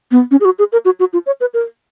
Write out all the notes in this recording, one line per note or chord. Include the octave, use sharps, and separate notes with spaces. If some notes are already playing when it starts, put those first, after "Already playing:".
B3
C#4
G#4
F#4
G#4
A#4
F#4
F#4
F4
C#5
B4
A#4